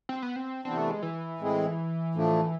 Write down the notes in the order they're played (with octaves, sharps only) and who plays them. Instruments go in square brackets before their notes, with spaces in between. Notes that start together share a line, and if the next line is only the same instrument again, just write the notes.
[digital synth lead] C4
B3
C4
[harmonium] C3 E3 B3 D4 [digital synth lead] C4
[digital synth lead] A3
G#3
E3
[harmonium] A2 G#3 C4 E4 G#4
A2 F3 A3 D4